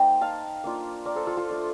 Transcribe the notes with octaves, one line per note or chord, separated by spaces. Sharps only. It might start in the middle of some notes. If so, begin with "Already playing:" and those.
Already playing: A#3 D#4 C5 D#5 G5 A#5
F5 A5
A#3 D4 F4
A#4 D5
A4 C5
F4 A4
F4 A4
A3 D4 F4